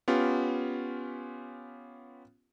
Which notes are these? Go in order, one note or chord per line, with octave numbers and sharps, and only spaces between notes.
B3 C#4 F4 G4